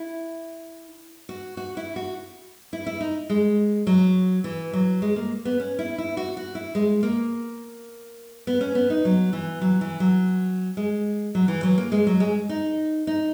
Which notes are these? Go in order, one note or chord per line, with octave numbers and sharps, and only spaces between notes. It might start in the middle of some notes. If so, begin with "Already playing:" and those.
Already playing: E4
F#4
F#4
E4
F#4
E4
E4
D#4
G#3
F#3
E3
F#3
G#3
A#3
B3
C#4
E4
E4
F#4
F#4
E4
G#3
A#3
B3
C#4
B3
D#4
F#3
E3
F#3
E3
F#3
G#3
F#3
E3
F#3
A#3
G#3
F#3
G#3
D#4
D#4